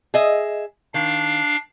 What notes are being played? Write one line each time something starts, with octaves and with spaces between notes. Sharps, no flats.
G#4 D#5 E5
D#3 D4 F5